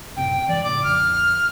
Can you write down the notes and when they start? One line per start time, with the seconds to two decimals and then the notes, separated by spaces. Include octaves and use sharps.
0.17 F#2 A2 C3 G5
0.49 F#1 G#2 E3 D5
0.64 A#1 A2 C#3 D6
0.84 A#1 F2 D3 F6